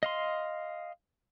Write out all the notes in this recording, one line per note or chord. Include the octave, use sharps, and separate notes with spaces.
D#5 F5 C6